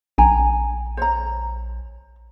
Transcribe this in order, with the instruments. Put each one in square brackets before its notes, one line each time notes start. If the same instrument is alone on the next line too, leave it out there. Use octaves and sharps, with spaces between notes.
[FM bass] A#1 [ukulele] G5 G#5 A#5
[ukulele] C5 C#5 A#5